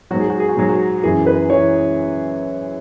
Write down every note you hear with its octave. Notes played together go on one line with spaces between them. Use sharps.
G#2 F#3 F#4
G#4
F#4
G#4
F#4
G#2 F#3 G#4
F#4
F#2 E3 G#4
B4
E3 C#5